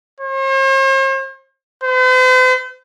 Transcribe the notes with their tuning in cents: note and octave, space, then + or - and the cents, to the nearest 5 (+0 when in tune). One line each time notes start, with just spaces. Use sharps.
C5 +45
C5 -45